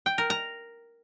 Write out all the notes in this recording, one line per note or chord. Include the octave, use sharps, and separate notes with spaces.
G5
A#4
A#5